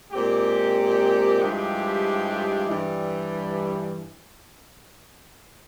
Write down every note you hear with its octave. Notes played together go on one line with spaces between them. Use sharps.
A#2 G#3 C4 G4
G2 F3 G#3 E4 G4
G2 E3 G3